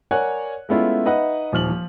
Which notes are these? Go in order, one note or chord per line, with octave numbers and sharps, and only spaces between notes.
A#4 C#5 D5 F#5 G#5 F#6
G#3 A3 B3 C#4 E4 F4
D#4 B4 D#5 E5 F#5
D#1 F3 F6 F#7
F3